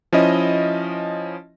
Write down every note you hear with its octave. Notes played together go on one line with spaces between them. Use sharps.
F3 C#4 E4 D#5